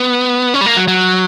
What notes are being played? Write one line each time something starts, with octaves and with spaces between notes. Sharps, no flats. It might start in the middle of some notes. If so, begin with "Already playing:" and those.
Already playing: B3
C#4
G3
A#3
F#3
F#3